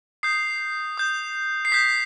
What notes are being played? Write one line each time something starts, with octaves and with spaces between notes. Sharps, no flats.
D#6 G6 C7
D#6 G6
C7
D#6 G6 B6